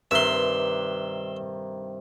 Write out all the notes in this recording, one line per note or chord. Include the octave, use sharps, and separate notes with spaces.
G2 C3 D#3 E5 C6